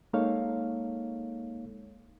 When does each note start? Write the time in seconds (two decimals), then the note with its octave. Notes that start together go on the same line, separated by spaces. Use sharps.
0.13 G#3 A#3 D#4 A4 C#5 F5